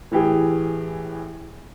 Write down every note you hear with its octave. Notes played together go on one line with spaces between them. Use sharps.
A2 E3 G4 G#4